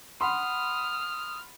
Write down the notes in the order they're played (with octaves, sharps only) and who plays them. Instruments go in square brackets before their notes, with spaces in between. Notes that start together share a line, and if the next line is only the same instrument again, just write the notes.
[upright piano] F#5 B5 C6 [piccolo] D#6 [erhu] F6